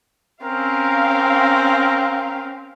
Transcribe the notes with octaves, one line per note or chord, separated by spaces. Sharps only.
C4 C#4 A#4 F5